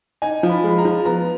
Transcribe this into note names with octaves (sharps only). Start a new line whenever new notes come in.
D#4 G#5
F3
B5
G#3 B5
A#5
F3
B3 A#5